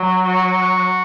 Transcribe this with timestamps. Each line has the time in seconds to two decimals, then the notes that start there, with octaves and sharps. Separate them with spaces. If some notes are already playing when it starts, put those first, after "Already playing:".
Already playing: F#3
0.26 F#4